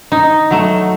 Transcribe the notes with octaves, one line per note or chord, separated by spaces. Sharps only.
D#4
F#3 A3